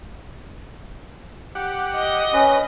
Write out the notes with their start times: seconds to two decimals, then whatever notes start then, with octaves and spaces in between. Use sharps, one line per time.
1.55 G4 F#5
1.95 D#5
2.34 C#4 B4